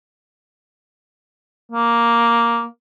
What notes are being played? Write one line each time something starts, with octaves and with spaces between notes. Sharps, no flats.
A#3